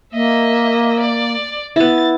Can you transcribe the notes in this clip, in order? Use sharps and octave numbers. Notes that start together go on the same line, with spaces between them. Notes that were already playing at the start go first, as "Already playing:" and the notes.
A#3 D#5 E5
D5
B3 E4 A6